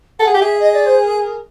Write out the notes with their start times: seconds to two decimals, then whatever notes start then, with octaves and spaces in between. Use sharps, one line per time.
0.19 A4 F#5
0.27 G#4
0.34 G4
0.40 G#4 E5
0.60 D#5
0.73 D5
0.86 C5
1.00 A#4
1.19 A#4